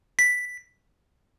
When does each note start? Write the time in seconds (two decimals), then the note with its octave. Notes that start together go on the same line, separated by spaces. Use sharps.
0.19 B6